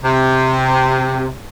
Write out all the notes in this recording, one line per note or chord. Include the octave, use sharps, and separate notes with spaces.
C3